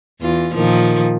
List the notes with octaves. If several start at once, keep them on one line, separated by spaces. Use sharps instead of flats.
E2 F4
A#2 D#3 F3